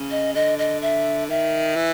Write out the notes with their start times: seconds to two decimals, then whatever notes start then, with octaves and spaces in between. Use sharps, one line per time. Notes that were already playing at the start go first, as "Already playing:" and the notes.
Already playing: C#3
0.11 D#5
0.35 D3 D#5
0.59 D#5
0.82 E5
1.30 D#3 E5
1.76 E3